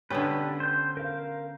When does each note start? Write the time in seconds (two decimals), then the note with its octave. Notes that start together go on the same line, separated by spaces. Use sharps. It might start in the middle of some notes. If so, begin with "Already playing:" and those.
0.10 D3 B3 C#4 D4 G4 B4
0.60 C5 G6
0.97 A#4 F5